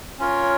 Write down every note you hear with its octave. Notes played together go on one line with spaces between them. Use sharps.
C#4 F4 A#4 C#5